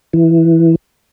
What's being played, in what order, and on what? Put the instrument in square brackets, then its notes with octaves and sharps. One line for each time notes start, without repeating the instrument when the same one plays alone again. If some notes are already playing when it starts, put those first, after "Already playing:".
[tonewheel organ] E3